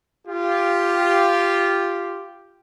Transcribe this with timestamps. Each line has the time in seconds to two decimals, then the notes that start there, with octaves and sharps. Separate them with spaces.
0.28 F4 G4